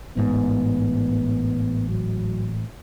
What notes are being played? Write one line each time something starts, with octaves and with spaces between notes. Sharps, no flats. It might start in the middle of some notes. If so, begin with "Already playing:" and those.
A1 G#2 B3
F#3